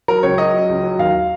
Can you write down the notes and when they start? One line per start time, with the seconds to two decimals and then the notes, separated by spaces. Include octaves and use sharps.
0.08 F#3 A#4
0.23 C#2 C#5
0.38 F#3 D#5
0.54 F#3
0.69 C#2
0.83 F#3
0.99 D#2 F5